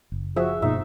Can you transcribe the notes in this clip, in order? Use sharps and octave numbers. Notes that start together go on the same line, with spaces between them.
F#1
F3 F#4 G#4 E5
G2 B2 A#3 D#4 E5